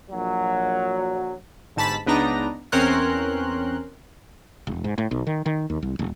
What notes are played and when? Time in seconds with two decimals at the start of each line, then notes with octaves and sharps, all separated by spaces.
0.10 A#1 F#3
1.76 G1 G#2 A5 B5 B6
2.06 C#2 B3 D4 D#4 A#5
2.72 E2 C4 C#4 A#4 C6 F#6
4.67 E1
4.84 G#2
4.98 A2
5.11 B1
5.27 D#3
5.46 D#3
5.70 D#2
5.82 C2
5.99 D#1